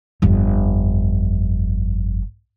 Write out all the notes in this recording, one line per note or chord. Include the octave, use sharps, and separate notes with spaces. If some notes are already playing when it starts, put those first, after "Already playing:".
G1 F2